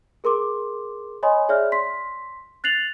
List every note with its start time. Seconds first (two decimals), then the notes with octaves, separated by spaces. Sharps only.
0.24 G#4 A#4 C6 D6
1.23 C#5 D#5 G#5 B5 C6 D#6
1.49 G#4 C#5 D5 E5 F6
1.72 C6 B6
2.64 F#6 A6 C7 F7 F#7